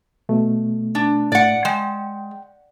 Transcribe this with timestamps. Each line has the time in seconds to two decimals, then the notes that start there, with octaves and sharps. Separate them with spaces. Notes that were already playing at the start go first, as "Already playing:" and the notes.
0.29 B2 A3
0.95 D4
1.32 A2 D5 F#5
1.65 G#3 G5